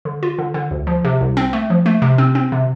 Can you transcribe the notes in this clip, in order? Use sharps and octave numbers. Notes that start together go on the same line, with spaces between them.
D3
F4
D3
D3
D2
F3
C3
C2
C4
A3
F3
A3
C3
C4
C4
C3